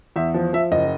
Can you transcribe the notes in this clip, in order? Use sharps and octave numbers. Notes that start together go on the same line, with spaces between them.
E2 E5
F3
F3 E5
F#1 D#5